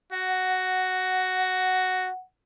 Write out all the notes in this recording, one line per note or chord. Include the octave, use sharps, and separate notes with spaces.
F#4 F#5